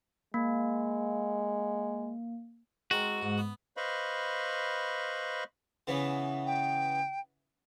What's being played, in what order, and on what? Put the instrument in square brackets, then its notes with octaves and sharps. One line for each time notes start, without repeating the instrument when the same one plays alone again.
[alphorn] G#3 [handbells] A#3
[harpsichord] G#3 C4 A#4 [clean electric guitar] F#4
[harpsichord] G#2
B3
[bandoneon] B4 C5 D#5 F5 B5 C#6
[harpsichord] C#3 E3 B3
[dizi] G5